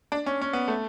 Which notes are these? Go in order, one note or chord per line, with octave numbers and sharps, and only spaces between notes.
D4
C#4
C#4
B3
A3